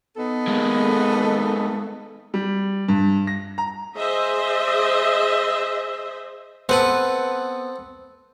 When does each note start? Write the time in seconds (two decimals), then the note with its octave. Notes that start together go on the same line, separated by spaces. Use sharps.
0.17 B3 D#4 A4
0.47 G#3 A#3
2.34 G3
2.88 G2
3.27 A#6
3.58 A#5
3.96 G#4 C5 D#5 E5
6.69 B3 C4 A4 B4